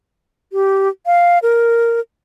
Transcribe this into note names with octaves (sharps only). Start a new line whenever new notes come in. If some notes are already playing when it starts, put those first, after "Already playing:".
G4
F5
A#4